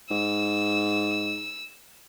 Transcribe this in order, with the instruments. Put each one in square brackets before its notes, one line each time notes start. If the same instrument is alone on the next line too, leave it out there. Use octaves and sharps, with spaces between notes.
[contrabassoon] G#2 [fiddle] E6